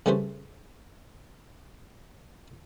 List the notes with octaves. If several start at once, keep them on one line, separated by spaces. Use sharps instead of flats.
C#3 G3 A3 C#4 B4 C5